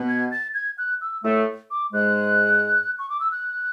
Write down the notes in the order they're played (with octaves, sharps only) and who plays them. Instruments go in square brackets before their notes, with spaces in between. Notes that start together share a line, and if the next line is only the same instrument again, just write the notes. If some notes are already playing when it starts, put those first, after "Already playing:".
Already playing: [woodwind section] B2 B3
[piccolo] G#6
A6
G#6
F#6
E6
[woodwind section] A2 A3 [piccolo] E6
[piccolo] D6
[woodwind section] G#2 G#3 [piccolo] F#6
[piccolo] C#6
D6
E6
F#6